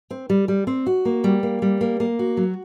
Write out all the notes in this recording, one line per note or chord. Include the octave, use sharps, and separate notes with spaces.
C4
G3
G3
C4
F#4
A#3
G3
A#3
G3
A#3
A#3
F#4
F#3